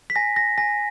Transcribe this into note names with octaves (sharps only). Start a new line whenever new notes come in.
B6
G#5 A#6
A#6
G#5 A#6